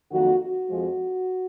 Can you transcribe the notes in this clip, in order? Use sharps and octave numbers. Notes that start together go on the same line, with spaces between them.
F2 D#3 F#3 A#3 F#4
F#4
F2 F3 G#3